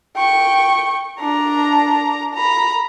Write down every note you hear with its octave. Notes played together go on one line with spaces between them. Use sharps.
G5 C#6
D4 A#5
A#5 B5